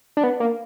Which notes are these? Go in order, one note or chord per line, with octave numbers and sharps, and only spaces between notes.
D4
B3
A#3